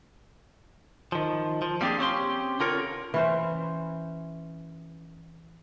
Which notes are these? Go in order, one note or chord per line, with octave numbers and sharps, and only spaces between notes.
D#3 F3
F3
G3 A#3 C4 D4 G4 G#4
C4 C#4 G4 C6
D3 F4 A#4 C#5
E3 C#4 C5